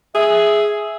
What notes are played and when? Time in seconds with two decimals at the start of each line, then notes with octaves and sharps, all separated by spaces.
0.15 G#4 E5